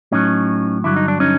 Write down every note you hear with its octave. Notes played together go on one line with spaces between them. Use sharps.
A2 F#3 C#4 D#4
G2 D3 F#3 E4
D#4
D4
C#4 D#4